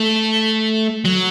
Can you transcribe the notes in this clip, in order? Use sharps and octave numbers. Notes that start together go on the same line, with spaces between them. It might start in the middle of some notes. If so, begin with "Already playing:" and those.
Already playing: A3
F#3